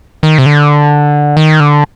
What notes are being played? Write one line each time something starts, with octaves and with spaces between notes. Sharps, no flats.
D#3
C3
D3
D#3
D3